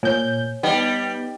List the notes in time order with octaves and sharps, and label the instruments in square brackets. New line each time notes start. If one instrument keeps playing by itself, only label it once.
[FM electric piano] A#2 G6 [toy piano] C#5 G#5
[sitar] G3 [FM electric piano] B3 [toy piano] D#4 D#5 G5